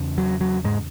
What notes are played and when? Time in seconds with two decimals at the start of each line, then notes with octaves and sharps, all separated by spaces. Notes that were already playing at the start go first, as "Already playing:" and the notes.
Already playing: E2 C#3
0.18 F#3
0.41 F#3
0.64 G#2 G#3